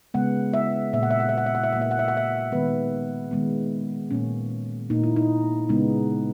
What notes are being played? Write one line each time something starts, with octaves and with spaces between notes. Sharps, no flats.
C#3 G#3 B3 F#5
E5
A#2 A#3 E5
F#5
E5
F#5
E5
F#5
E5
F#5
E5
A#2 A#3 F#5
E5
F#5
E5
F#5
E5
D#3 G#3 B3 B4
D#3 G#3 B3
A#2 A#3 C#4
A#2 A#3 D#4
E4
D#4
C#3 G#3 B3 D#4